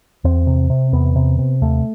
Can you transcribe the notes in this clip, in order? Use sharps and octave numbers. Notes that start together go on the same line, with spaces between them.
E2 C4
C3
C3
E2 B3
C3
C3
D#2 A3